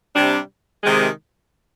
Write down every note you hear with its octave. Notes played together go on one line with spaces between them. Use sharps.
C3 G3 D4
C3 D#3 G#3